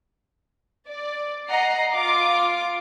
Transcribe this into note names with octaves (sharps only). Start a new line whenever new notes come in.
D5
D#5 F#5 A#5 C7
F4 D6 C7